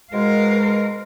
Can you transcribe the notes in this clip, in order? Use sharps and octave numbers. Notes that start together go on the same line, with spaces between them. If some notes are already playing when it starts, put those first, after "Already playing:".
G#2 B2 G#3 A#4 F5